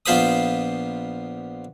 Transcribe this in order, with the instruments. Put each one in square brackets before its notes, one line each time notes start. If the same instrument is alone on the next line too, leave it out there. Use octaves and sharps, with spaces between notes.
[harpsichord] A#1 B3 F4 C5 B5 D#6